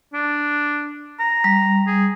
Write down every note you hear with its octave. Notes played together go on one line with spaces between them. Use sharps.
D4
A#5
G3
G#4